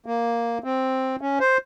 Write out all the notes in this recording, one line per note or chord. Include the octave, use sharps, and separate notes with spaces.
A#3
C4
C#4
C5